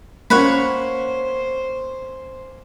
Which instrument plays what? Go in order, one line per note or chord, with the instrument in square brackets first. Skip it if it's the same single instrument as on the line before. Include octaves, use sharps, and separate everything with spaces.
[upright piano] A#3 C#4 [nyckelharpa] C5 [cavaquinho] C#5 F#5 B5